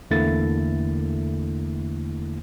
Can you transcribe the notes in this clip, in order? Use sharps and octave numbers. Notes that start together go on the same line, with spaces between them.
E2 D3 A3 A#3 E4 A6